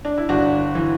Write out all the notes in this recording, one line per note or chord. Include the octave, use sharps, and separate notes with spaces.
D4
E4
G1 D4 F#4
E3